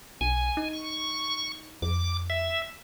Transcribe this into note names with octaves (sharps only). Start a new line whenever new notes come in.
B1 G#5
D#4
C#6
F2 D6
E5